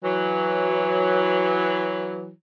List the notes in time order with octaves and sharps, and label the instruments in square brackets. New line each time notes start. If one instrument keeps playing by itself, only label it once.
[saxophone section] E3 F#3